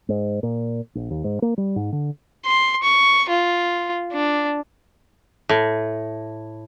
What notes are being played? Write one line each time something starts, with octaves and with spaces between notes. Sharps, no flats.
G#2
A#2
A#1
D#2
G#2
A#3
G3
G#2
D3
C6
C#6
F4
D4
A2